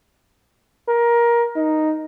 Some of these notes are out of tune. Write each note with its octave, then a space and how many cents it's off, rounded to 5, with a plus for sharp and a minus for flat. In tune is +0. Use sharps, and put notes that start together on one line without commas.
A#4 +20
D#4 +0